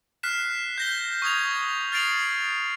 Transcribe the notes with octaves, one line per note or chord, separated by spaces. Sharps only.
F6 F#6 B6 C7 E7
G6 A#6 G7
C#6 D#6 G#6 F7
F6 A6 C7 D7 F7 F#7